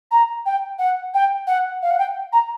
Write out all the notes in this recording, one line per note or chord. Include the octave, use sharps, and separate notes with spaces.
A#5
G5
F#5
G5
F#5
F5
F#5
G5
A#5